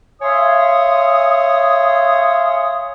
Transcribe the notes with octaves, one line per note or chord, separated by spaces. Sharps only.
C#5 E5 F5 G#5 C6 D#6